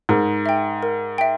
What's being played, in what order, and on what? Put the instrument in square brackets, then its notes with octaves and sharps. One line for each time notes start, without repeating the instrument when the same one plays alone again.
[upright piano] G#2 [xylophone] A#4
[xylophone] E5 G5
A#4
E5 G5